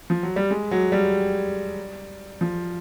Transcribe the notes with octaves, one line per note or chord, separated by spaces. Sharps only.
F3
F#3
G3
G#3
F#3
G3
F3